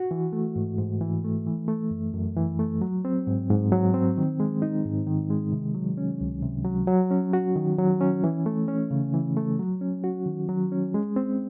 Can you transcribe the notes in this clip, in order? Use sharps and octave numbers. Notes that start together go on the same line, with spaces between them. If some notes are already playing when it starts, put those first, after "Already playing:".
Already playing: F#4
E3
A3
G#2
G#2
E3
A3
E3
A3
F#2
F#2
E3
A3
F#3
C4
G#2
G#2
F#3
C4
D#3
G#3
D#4
G#2
D#3
G#3
C3
F#3
C#4
C#2
C3
F#3
F#3
C#4
F#4
D#3
F#3
C#4
E3
A3
C#4
C#3
E3
A3
F#3
C#4
F#4
D#3
F#3
C#4
G#3
C4